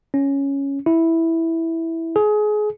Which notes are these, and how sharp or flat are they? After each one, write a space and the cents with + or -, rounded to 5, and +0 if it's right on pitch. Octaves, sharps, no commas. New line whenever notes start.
C#4 +0
E4 -5
G#4 +25